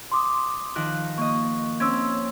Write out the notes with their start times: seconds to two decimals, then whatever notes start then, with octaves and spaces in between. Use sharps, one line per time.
0.12 C6 D6 D#6
0.76 D#3 F3 F#6
1.18 A#3 D#5 C#6
1.80 C4 C#4 C#5 E6 G#6